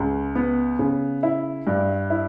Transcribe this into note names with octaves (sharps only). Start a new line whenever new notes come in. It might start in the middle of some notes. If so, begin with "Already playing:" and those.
Already playing: C#2
B3
C#3
E4
G2
E4